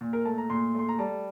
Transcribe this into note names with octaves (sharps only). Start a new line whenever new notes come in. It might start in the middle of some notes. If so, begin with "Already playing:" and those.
A#2
A#4
A3 A5
A#5
A#2 C6
A3 C6
A#5
G3 A5